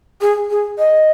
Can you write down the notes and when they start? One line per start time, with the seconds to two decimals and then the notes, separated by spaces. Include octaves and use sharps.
0.21 G#4
0.50 G#4
0.79 D#5